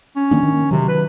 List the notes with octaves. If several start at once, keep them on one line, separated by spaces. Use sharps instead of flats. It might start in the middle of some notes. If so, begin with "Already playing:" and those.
C#4
D#3 A#3 D4
D#3
C3 D#3 F#3
B4